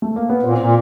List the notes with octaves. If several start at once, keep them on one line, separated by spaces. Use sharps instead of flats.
A3
A#3
B3
A#2 C4
A#2